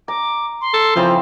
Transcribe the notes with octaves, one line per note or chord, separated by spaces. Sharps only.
A#5 D6
C6
A4
C#3 E3 F3 C4